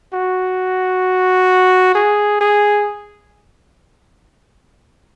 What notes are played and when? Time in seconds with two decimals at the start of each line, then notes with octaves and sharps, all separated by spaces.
0.14 F#4
1.95 G#4
2.41 G#4